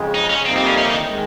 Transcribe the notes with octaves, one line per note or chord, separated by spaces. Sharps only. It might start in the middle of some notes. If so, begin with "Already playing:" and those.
Already playing: F2 C#3 G#3
D#4
C#4
F2 C3 G3 A#3 C4 D#4
C4
C#4
C#4
D#3
D#3 G#3